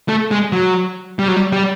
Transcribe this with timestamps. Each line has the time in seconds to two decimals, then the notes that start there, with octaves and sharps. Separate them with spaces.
0.08 A3
0.31 G#3
0.52 F#3
1.19 G3
1.28 F#3
1.36 G3
1.52 G3